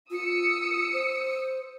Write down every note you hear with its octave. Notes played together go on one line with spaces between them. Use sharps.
F4 D#6 E6 C#7
C5